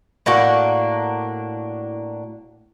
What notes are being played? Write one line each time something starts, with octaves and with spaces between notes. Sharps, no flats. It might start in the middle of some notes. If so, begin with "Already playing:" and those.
A2 A#3 D4 F#4